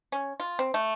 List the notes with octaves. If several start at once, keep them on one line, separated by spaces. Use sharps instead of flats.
C#4
F4
C4
A3